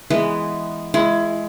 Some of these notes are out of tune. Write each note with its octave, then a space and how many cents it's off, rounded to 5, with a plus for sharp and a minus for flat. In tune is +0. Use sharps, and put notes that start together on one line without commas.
E3 +0 G#3 +0 B3 +0
G#3 +15 E4 +30